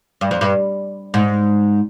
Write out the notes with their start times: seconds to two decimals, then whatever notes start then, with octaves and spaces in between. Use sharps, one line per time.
0.21 G2
0.31 F2
0.41 G2
1.14 G#2